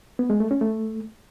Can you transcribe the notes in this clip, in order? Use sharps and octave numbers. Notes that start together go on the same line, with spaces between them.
B3
G#3
A3
C#4
A3